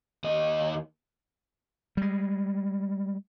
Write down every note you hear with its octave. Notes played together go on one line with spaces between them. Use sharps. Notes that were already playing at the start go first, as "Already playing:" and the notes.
D#2 D#5
G3 G#3